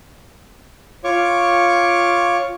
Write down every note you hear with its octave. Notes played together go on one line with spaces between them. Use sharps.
F4 C#5 C#6 D6